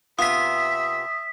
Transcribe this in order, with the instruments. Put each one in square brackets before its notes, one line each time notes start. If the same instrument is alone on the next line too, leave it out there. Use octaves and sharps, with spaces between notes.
[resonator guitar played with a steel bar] C3 B3 F4 [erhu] E5 [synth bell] D#6 B6